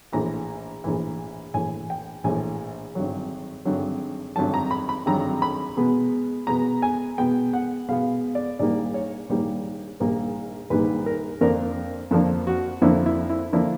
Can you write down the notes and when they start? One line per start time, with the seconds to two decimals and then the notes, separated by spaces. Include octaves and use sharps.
0.13 A#1 A2 E3 A#5
0.84 A#1 A2 E3
1.54 A#1 A2 E3 G#5
1.90 G5
2.24 A#1 A2 E3 G#5
2.95 G#1 G2 D3 F#3
3.65 G#1 G2 D3 F#3
4.36 G#1 G2 D3 F#3 A5
4.54 A#5
4.71 B5
4.89 B5
5.06 G#1 G2 D3 F#3 A#5
5.42 B5
5.77 B2 G#3 B3
6.47 B2 G#3 B3 A#5
6.82 G#5
7.18 B2 G#3 B3 G5
7.53 F#5
7.88 B2 G#3 B3 F5
8.35 D5
8.59 A#1 G#2 D#3 G3 A#3 D5
8.94 C#5
9.29 A#1 G#2 D#3 G3 A#3
10.00 A#1 G#2 D#3 G3 A#3
10.70 A#1 G#2 D#3 G3 A#3 B4
11.06 A#4
11.41 F2 D3 F3 A#3 D4 A#4
12.11 F2 D3 F3 A#3 D4 A4
12.47 F#4
12.82 F2 D3 F3 A#3 D4 E4
13.06 E4
13.29 E4
13.52 D3 F3 A#3 D4 E4